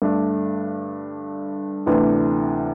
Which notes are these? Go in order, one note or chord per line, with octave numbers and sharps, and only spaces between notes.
G2 D3 A3 D4
D2 C3 E3 B3 D4